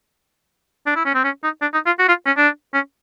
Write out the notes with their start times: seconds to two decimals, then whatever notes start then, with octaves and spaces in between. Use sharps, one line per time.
0.87 D4
0.96 E4
1.06 C#4
1.15 C4
1.24 C#4
1.44 D#4
1.62 D4
1.74 D#4
1.86 F4
1.99 F#4
2.08 F4
2.26 C#4
2.37 D4
2.74 C#4